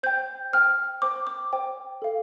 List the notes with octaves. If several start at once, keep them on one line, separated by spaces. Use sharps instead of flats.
C5 G5 G6
C5 G5 F6
C5 G5 D6
D6
C5 G5
A4 F5